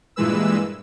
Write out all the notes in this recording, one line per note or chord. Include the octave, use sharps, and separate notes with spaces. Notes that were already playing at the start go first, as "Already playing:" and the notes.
G2 A#2 E3 G#3 B4 E6